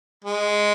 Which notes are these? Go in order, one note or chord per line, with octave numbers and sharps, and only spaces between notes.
G#3